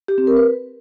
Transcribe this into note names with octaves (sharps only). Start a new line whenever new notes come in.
G4
C4
A#4
B4